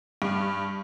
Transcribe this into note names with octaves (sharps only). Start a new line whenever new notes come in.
G2